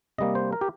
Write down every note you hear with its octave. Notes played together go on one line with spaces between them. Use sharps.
C3 G3 A#3 D#5
C5
A#4
G4